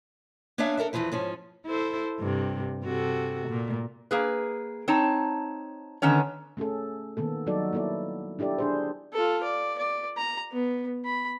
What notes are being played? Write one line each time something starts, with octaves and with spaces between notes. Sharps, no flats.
A#3 B3 C#4 D4 E5 F5
A4 A#4 D5 E5
E2 A#2 E3 F3 B4
G#2 F3 C#4
E4 A4 C5
G2 C3
C3 F#4 A4
A#2
A#3 G#4 B4
C4 D#4 C#5 A5
D3 D#3 B3 C#4 C#5
A3 C#4 G#4 A4
D#3 A#3 B3 A4
F#3 G3 D#4 F#4 A4 D5
A#3 B3 E4 A4 D5
D4 E4 G4 A4 D5
D4 G#4 C5
F4 A4
D5
D5
A#5
B3
B5